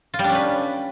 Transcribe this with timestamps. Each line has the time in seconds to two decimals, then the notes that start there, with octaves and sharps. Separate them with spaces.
0.14 F4
0.19 G3
0.24 D4
0.29 C#4
0.35 B4